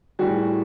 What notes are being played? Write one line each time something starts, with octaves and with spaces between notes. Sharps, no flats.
A2 E3 G3 F#4 G#4